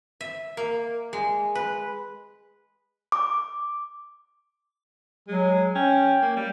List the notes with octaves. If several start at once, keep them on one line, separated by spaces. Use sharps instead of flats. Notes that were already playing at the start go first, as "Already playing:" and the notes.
E5
A#3
G#3
B4
D6
F#3 G#3
C#4 G5
A#3
G3